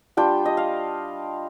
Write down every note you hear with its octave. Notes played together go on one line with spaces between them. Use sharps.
G3 D4 F4 G5
D#5
F5